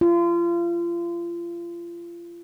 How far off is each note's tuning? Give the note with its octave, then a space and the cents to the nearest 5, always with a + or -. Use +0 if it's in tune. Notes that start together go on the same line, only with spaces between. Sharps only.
F4 -30